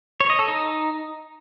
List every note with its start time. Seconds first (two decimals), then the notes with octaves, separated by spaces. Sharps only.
0.20 C#5
0.30 D#5
0.39 A4
0.48 D#4